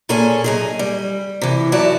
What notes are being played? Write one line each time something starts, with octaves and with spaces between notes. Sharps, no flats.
A#2 C#4 G#4 A4 G#5
F#2 D#4 G#4
G3
C3 E3
F#2 E4 F#4 D5 A5